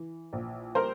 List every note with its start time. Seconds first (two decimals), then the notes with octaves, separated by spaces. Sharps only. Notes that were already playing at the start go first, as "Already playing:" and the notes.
Already playing: E3
0.33 A#1
0.75 G3 A#4 C5